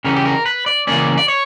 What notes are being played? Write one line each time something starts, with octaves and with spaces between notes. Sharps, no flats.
C#3 E3 G3 C#4 A#4
G4
A#4
B4
D5
C#3 E3 A#3 C#4 D5
D5
C#5